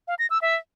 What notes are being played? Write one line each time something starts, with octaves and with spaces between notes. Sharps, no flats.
F5
A#6
E6
E5